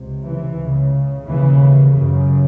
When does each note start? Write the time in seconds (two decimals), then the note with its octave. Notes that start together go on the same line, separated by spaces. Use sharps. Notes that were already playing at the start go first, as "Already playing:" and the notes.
Already playing: C#2 C3
0.23 E3
0.57 C#2 C#3
1.26 D#2 C#3 E3
1.96 F#2 C#3